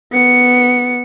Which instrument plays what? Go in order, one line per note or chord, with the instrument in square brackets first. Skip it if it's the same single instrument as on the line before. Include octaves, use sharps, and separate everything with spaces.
[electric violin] B3 C#7